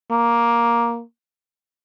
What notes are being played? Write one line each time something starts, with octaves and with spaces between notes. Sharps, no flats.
A#3